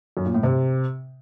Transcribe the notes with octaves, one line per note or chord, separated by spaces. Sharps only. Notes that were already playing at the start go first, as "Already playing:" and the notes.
F#2
A#2
A2
C3